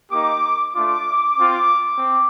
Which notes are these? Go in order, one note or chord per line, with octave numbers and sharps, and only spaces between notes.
A#3 D#4 G4 D6
A3 D4 F4 D6
C4 F4
C4